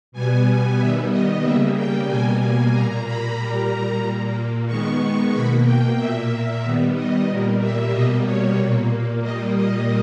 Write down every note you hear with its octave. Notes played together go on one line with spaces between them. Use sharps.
B2 G3 B3 G#5
D#3 G3 B3 E5
D#5
C#3 G3 A#3 E5
G5
B2 G3 A#3 G#5
A#2 A#3 A#5
B5
A#2 G3 A#3 A#5
A#5
A#2 A#3
D#3 G#3 B3 C#6
B2 A#3 B5
G5
A#2 A#3 E5
D#3 G3 B3
D#5
A#2 G3 A#3
E5
B2 G3 A#3 D#5
C#5
A#2 A#3
A#2 G3 A#3 D#5
D#5